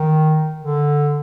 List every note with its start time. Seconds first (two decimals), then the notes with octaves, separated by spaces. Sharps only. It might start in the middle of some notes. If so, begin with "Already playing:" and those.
Already playing: D#3
0.62 D3